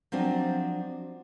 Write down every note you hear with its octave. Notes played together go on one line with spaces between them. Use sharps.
F3 F#3 C4 D4 D#5